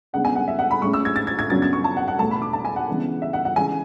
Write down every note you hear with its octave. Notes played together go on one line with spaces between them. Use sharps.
C#3 G#3 B3 D4 F#5
G#5
F#5
E5
F#5
B5
A2 G#3 C#4 C#6
E6
G#6
A6
G#6
G#6
F#2 C#3 F#3 B3 D4 A6
G#6
C#6
A5
F#5
F#5
E2 B2 A3 A5
B5
D6
A5
G#5
F#5
C#3 E3 G#3 B3 D4
E5
F#5
F#5
C#3 E3 G#3 G#5